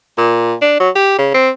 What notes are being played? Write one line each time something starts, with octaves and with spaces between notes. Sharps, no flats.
A#2
D4
F#3
G4
C#3
C4